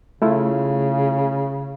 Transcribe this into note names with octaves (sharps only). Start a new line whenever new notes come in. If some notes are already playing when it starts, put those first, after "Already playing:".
C#3 A3 E4 F4